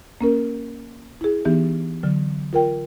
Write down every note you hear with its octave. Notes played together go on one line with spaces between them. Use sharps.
A#3 C#4 A#4
E4 G#4
E3 B3 D#4 G4
D3 F#3
F4 A#4 G5